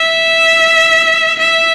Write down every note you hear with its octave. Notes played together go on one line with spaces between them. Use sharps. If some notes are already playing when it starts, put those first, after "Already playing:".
Already playing: E5
E5